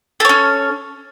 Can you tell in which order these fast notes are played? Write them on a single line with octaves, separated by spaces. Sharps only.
A4 C#5 C#4